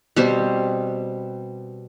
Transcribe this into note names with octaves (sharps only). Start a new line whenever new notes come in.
B2 G3 C4 C5